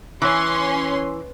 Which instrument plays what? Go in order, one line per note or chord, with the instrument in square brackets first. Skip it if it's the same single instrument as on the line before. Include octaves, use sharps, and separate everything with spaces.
[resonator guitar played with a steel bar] E3 [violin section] C#4 C6